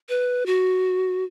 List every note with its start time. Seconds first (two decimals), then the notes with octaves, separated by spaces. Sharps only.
0.09 B4
0.46 F#4